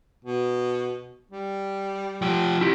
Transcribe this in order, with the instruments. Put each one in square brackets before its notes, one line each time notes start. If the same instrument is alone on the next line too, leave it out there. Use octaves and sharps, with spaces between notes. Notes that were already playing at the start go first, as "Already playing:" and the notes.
[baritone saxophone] B2
G3
[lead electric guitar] F3 G4
[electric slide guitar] E4 G4